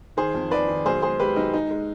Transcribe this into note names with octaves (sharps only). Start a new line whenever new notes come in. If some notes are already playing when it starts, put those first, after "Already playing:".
D#3 G#4 C5
F2
D#3 B4 D5
D#3
B1 G#4 C5
G#3 G#4 C5
G#3 G4 B4
B1 D#4 G4
G#3 D#4
G#3